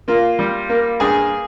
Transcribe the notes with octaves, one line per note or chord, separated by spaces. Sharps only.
A#3 F4
G3
A#3
G2 G#4